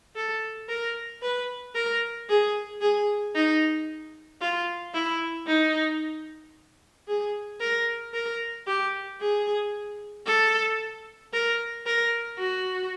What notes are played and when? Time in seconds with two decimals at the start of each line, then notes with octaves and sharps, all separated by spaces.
0.16 A4
0.68 A#4
1.22 B4
1.75 A#4
2.29 G#4
2.81 G#4
3.35 D#4
4.41 F4
4.94 E4
5.47 D#4
7.08 G#4
7.60 A#4
8.14 A#4
8.67 G4
9.20 G#4
10.26 A4
11.33 A#4
11.86 A#4
12.39 F#4